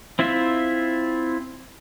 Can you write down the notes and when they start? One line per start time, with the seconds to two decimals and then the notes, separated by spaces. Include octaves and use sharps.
0.19 C4 E4 F4 E5